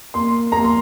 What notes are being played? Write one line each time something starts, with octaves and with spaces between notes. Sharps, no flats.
A#3 C6
A#3 A#5
C6